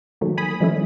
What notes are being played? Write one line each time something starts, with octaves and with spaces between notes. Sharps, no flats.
D#3 F#3 A3 A#3
G#5 B5 D#6
D#3 F3 G3 A3 C#4 E4